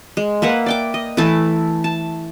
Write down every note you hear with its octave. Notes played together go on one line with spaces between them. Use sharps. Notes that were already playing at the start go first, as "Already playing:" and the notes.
G#3
A#3 B4 E5 F#5
D5 G5 D6
D#5
E3 A3 E4 A5
A5